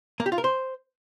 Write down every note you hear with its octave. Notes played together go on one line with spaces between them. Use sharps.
A#3
G4
F4
A#4
C5